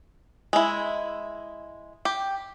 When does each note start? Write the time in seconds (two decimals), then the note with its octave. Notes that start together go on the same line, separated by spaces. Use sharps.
0.53 G#3 E4
2.05 G4